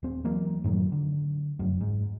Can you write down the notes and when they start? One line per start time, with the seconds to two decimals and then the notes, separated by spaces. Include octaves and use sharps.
0.03 D#1 C4
0.24 E3 F#3 A#3
0.64 F#2 A2 D#3 F#3
0.92 D3
1.59 F1 F#2
1.81 G#2